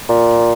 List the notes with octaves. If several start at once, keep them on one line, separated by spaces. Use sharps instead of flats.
A#2